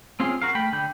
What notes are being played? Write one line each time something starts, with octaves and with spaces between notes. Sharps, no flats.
C4 C#4 F4 G#4
F#4 A#4 F5
A3 G5 B5
D3 G5 B5 G6